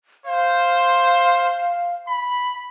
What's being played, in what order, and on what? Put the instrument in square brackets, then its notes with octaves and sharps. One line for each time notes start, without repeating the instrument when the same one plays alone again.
[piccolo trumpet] C5 [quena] F5
[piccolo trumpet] B5